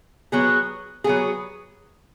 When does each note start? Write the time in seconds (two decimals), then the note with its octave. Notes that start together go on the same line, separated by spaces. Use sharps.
0.32 F#3 B3 G#4
1.04 F#3 B3 G#4